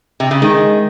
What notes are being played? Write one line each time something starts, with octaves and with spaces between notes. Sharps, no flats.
C3
C#3
D#3 G#3